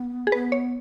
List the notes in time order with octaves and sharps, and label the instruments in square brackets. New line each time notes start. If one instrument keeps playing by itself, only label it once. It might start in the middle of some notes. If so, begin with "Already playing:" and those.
Already playing: [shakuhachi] B3
[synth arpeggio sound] G#4
[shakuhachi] B3 [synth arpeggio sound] B4
[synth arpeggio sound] C#5